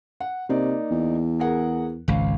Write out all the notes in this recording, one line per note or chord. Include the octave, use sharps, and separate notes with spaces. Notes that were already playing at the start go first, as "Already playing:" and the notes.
F#5
C3 A#3 D#4 D5
E2
G#4 A#4 F#5
G#1 C#2 F5